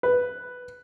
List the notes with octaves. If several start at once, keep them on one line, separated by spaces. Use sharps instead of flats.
B4